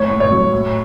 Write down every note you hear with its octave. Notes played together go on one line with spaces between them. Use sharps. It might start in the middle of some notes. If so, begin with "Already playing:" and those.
Already playing: A2 C#5
A2
C#5
F#3
A2